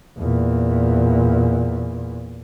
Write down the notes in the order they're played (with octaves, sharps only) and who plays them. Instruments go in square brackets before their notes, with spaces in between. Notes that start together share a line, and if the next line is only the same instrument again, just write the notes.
[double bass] E2 A#2